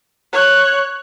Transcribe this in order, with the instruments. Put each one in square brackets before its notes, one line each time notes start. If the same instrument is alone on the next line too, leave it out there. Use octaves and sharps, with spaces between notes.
[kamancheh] C#5 F#6